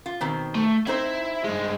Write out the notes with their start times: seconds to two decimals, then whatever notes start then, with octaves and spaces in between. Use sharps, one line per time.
0.06 F4
0.21 B2 D#3 C4
0.55 A3
0.87 C4 D#4 E4 C5 E5
1.44 G2 G#3